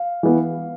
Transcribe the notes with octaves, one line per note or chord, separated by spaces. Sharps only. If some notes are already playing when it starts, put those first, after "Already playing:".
Already playing: F5
E3 B3